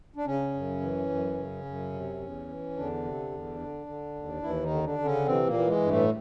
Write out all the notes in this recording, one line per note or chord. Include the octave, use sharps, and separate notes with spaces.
D4
C#3 C#4
F#2
E3
F#2
C#3
F#2
C3
E2
E3
E2 D3 D4
C3
E2
D3
D3
D#2
D#2 E3 E4
D#3 D#4
D3
D3 D4
D3
C#3 C#4
C3 E3 C4
A#2 A#3
E3
G#3
G2
A2 A3